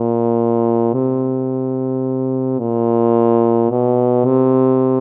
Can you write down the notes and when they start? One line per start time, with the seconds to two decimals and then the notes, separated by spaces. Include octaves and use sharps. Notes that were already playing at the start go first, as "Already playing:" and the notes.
Already playing: A#2
0.93 C3
2.59 A#2
3.71 B2
4.25 C3